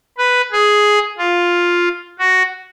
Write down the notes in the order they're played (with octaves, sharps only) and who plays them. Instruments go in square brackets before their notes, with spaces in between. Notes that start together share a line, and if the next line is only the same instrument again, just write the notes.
[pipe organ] B4
G#4
F4
F#4